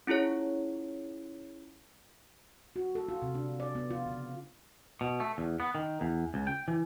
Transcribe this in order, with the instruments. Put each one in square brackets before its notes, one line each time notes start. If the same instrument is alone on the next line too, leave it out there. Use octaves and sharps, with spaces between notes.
[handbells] C#4 E4 F4 G#4 C#5
[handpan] F#4
A4
F4
C3
D4
D5
B3
F4
C#3
[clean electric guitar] B2
A3
E2
B3
D#3
E2
C#2
G5
E3